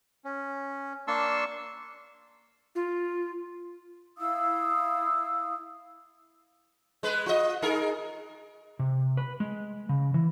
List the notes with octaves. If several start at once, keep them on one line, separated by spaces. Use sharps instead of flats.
C#4
A#3 D4 A5 C6 C#6 E6
F4
E4 F5 D#6 E6
G#3 B4
F4 D#5
D#4 G#4 A#4
C3
B4
G#3
C#3
E3